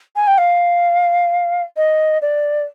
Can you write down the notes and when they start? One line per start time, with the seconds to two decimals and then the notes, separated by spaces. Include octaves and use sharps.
0.16 G#5
0.27 G5
0.38 F5
1.77 D#5
2.22 D5